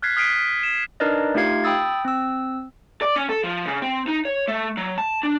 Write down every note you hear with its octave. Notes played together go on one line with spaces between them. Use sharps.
F6 F#6 G#6 A6 B6 C7
D#6 F6 B6 C7 D7 D#7
F6 D7
E7
D4 D#4 A#4 B4 D5 D#5
A3 D#4 F4 G4 F5 G#6
G5 B5 D#6 E6 A6
C4 E6
D5
C#4
A4
F3
C#3
C4
D#4
C#5
A3
F#3
A5
D4